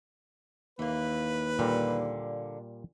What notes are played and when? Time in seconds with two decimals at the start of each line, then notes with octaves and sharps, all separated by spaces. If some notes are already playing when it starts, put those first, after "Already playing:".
0.79 D#2 E3 A#3 B4
1.59 A#2 D3 G3 A#3